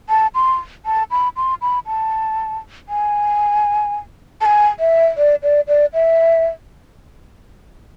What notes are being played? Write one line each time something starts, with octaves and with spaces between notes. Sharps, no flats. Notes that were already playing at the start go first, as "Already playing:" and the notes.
A5
C6
A5
B5
C6
B5
A5
G#5
A5
G#5
E5
D5
D5
D5
E5